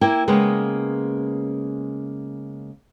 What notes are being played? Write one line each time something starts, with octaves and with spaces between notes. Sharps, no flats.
A#3 E4 G5
C#3 G#3 A#3 B3